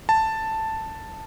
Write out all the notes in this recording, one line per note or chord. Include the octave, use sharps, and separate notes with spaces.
A5